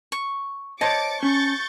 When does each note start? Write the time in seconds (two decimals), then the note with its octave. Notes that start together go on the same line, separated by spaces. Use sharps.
0.12 C#6
0.81 C5 C#5 D#5 A5 D6 A6 C#7
1.23 C#4 C#6 G6 A6